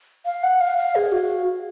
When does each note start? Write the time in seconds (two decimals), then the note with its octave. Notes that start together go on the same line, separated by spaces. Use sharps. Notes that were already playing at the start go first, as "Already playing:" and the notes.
0.26 F5
0.43 F#5
0.61 F5
0.77 F5
0.95 G#4
1.12 F#4